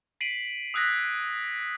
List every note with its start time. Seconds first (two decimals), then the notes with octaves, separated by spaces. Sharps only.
0.21 B6 C7 D7 D#7 F#7
0.74 D#6 E6 F#6 G#6 A#6 B6